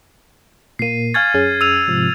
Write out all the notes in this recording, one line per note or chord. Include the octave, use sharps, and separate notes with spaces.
A#2 A#3 C7 D#7
F5 G#5 C#6 F6 G#6 A6
F#2 C#4 G#4
E6 D#7 F7
G#2 C3 F3